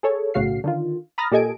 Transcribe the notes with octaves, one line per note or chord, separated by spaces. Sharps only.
G#4 A4 C#5
B1 A2 C#3 F#4 F5 C7
D3 D#3 F4
A#5 B5 D#6 F6 A6 A#6
A#2 G4 A4 D#5 G#5 D7